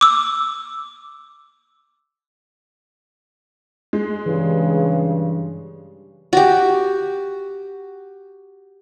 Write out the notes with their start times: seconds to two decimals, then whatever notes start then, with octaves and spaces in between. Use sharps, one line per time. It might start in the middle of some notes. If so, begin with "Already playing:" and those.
0.01 D6 E6
3.93 G#3
4.26 G2 C#3 E3
6.33 F#4 G4